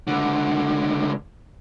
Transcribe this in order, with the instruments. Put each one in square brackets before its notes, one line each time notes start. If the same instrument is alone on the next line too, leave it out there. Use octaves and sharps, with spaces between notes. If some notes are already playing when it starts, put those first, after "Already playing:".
[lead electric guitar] C#2 D3